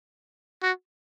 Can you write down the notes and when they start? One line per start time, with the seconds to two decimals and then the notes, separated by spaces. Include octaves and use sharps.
0.63 F#4